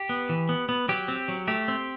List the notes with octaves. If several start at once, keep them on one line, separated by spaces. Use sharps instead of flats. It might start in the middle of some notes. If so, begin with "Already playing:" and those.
Already playing: G4
B3
E3
B3
B3
F#3 G4
C4
F#3
A3 G4
C4